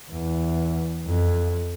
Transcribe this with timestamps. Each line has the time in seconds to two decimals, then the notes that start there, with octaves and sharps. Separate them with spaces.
0.11 E2
1.06 F2